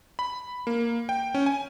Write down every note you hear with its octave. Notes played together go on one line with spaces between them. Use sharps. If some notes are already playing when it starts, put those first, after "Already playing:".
B5
A#3
G5
C#4
G#5